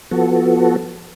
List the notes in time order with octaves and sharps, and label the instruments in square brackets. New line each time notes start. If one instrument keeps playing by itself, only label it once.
[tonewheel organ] F3 B3 F#4 A4